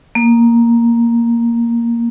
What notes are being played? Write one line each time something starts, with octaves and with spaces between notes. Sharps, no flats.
A#3